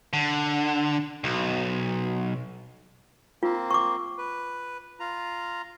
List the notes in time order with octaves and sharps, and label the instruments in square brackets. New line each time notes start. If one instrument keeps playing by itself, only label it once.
[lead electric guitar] D3
B1
[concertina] A#3 C4 [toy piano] F4
[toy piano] C#6 D6
[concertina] B4
F4 A#5